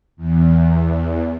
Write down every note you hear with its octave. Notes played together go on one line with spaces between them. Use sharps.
E2